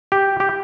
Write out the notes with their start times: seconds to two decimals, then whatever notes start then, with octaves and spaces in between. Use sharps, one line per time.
0.12 G4
0.40 G4